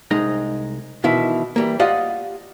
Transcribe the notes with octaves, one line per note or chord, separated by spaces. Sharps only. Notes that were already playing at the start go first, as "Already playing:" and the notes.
C2 G#3 D#4 D#5
B2 D#3 E3 E4
E3 G3 A#3
F4 G4 D5 D#5 F5 F#5